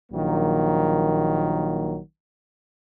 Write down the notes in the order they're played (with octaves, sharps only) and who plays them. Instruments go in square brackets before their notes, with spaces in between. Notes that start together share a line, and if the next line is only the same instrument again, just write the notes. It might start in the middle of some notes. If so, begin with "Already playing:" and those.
[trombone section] A#1 D#3 F#3 A#3